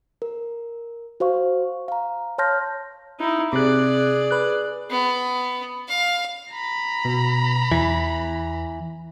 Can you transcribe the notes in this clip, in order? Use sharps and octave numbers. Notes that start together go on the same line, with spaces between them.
A#4
F#4 C5 F5 C#6
F5 A#5
C#5 A5 C6 F6 G6 A#6
D#4 E4
C3 G#4 D5 F#6
B4 F#6
B3
F5
A#5 B5
B2
E2 E3